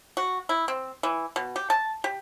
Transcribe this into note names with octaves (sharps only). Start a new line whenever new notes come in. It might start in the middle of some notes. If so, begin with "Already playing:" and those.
F#4
E4
C4
E3
B2
G4
A5
G4